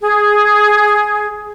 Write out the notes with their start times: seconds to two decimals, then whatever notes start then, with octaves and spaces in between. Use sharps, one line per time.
0.01 G#4